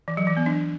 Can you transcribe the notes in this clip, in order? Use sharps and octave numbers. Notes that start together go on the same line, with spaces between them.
E3
F#3
E3
B3
D4